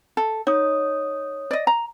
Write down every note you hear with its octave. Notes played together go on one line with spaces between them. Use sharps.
A4
D#4 C#5 D#6
D5 D#5
A#5